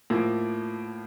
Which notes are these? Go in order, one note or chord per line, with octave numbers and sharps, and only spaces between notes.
A2 F3 A#3